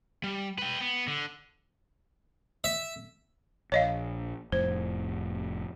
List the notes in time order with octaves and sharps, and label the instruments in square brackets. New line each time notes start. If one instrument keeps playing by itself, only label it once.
[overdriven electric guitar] G3
B4 G5
B3
D3
[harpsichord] E5
[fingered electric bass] A#1 [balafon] C#5 D#5 F5
[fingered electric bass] F1 F2 A2 [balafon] C5